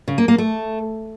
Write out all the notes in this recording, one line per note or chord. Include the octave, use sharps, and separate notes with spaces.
C#3
A#3
A#3
A3